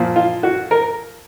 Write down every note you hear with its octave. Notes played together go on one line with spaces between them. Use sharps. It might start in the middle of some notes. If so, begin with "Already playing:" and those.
Already playing: A#2 F3
F4
F#4
A#4